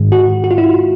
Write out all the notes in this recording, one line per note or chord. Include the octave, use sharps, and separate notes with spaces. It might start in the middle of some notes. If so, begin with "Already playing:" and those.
Already playing: G#2 D#3 G#3
F#4
F#4
F4
E4